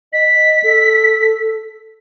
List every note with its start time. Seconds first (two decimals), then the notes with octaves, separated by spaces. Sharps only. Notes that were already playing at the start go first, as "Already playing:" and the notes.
0.13 D#5 B6
0.64 A4